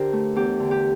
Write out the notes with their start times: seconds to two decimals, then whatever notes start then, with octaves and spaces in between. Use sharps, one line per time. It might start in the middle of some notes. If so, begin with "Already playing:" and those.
Already playing: D3 D4 G4 A#4 C5
0.13 A3
0.35 E2 G4
0.60 D3
0.71 G4